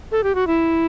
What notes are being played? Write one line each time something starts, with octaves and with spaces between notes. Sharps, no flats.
A4
G4
F#4
E4